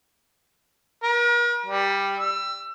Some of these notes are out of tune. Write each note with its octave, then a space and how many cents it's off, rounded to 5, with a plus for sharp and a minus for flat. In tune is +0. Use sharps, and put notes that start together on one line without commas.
A#4 +45
G3 +10
E6 +25